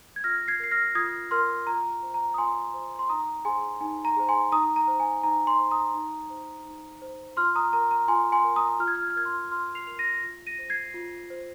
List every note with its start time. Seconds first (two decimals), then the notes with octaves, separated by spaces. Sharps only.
0.16 G#6
0.24 F4 F6 A#6
0.48 G#6 C7
0.60 A#4 C7
0.71 F6 A#6
0.95 F4 D#6 G#6
1.31 A#4 C6 F6
1.67 F4 A#5
2.03 C5
2.14 A#5
2.34 D#6
2.38 F4 G#5 C6
2.74 C5
2.99 C6
3.09 D#4 A#5 D#6
3.45 G#4 C5 G#5 C6
3.81 D#4 G#5
4.05 A#5
4.16 G#4 C5
4.29 G#5 C6
4.52 D#4 A#5 D#6
4.76 A#5
4.88 C5
5.00 G#5
5.24 D#4 A#5
5.47 G#5 C6
5.60 C5
5.71 A#5 D#6
5.94 D#4
6.30 C5
6.66 D#4
7.02 C5
7.37 F4 C6 F6
7.56 A#5 D#6
7.73 A#4 A#5
7.91 A#5
8.08 F4 G#5 C6
8.32 G#5 C6
8.44 A#4
8.56 A#5 D#6
8.80 F4 F6
8.88 G#6
8.95 F6
9.03 G#6
9.10 F6
9.16 A#4 G#6
9.25 C6 F6
9.51 F4 C6 F6
9.75 C7 F7
9.87 A#4 F7
9.99 A#6 D#7
10.23 F4
10.47 A#6 D#7
10.58 C5
10.70 G#6 C7
10.94 F4
11.30 C5